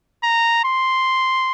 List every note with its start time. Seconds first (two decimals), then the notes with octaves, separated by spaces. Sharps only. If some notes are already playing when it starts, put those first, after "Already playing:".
0.24 A#5
0.65 C6